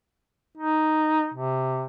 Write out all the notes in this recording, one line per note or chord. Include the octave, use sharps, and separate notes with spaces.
D#4
C3